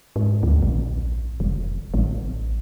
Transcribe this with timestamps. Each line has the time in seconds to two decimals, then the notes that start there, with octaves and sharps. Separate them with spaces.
0.16 G#2
0.43 D2
0.62 A#1
1.40 F1
1.94 A1